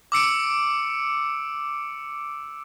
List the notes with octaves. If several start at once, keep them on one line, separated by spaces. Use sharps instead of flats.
D6 E6 C#7 D7